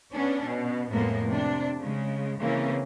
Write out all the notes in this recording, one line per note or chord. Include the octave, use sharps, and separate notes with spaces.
B3 C#4 D4
B2
F2 A2 G#3 A#3 B3
C3 D4
C#3 G#3
C#3 E3 A#3 C4 C#4